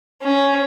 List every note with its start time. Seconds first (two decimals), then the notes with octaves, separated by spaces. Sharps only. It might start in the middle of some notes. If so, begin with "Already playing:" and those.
0.22 C#4